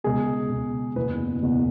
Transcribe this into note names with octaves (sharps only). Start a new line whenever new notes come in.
C#2 B2 G#4
C#2 B2
F#1 E2 B2 B4
F#1 E2 B2